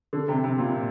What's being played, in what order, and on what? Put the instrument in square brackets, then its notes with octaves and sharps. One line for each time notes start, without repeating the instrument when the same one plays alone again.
[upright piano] D3
C3
C3
A#2